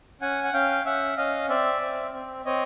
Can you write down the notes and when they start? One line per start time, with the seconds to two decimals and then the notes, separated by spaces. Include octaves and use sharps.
0.21 C#4 F#5 G#5
0.44 F#5
0.53 C#4 F5 G5
0.85 C#4 E5 F#5
1.17 C#4 D#5 F5
1.49 C4 D5 E5
1.81 C4
2.14 C4
2.45 C4 C#5 D#5